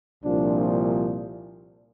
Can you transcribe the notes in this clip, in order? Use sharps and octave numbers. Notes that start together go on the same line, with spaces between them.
C2 A#2 F3 D4